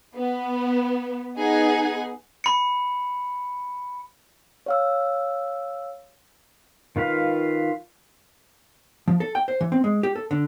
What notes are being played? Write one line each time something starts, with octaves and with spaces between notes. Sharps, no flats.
B3
B3 D#4 G#4 F#5 G#5
B5 C#7
C#5 F5 E6
D#3 F4 B4 F5
F3
A4
G5
C5
E3
C4
G#3
G4
A4
D3